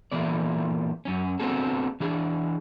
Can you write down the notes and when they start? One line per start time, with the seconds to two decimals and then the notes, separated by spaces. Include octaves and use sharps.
0.12 A#2 E3 A3 B3 D5
1.05 F#2 C#4
1.39 B3 C4 D4 F#4 G#4 A4
2.00 E3 D4 G#4